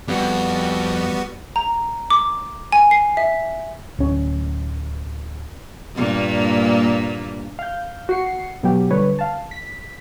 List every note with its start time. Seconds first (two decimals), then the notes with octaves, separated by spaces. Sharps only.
0.08 F2 G3 B3 F#4
1.56 A#5
2.10 D6
2.72 G#5
2.91 C7
3.17 E5
3.99 D1 C#4
5.96 G2 A#2 A#3
7.59 F5 G6
8.09 F#4 C7 C#7
8.63 B2 F#3 G4
8.90 D3 G3 B4 C#5
9.19 F5 A5
9.51 B6